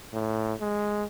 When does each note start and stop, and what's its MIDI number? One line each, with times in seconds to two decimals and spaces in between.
0.13 0.54 45
0.61 1.04 56